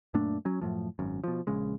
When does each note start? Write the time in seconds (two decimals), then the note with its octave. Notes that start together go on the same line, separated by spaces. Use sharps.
0.14 F#2 A#2 A3 D4
0.45 F#3 C#4
0.61 F#2 A2 F3
0.99 G#1 F#2
1.24 B2 F3
1.47 A#1 C#3 G#3